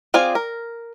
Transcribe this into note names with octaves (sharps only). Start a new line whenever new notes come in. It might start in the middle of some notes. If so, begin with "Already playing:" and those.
C4 F4 G#4 D5 G#5
A#4